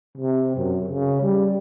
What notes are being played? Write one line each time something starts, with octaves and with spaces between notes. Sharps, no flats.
C3
F#2
C#3
G3